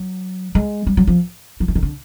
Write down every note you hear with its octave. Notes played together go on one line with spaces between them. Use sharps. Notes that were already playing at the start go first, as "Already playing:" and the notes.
Already playing: F#3
G#3
G3
F#3
F3
F3
E3
D#3
D3